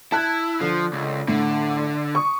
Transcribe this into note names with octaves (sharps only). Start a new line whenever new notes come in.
E4 A5 F#6 G#6
D3 F3
C#2
A2 D3
C#6 D#6